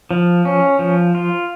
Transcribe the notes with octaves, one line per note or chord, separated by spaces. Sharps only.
F3
C#4
F3
F4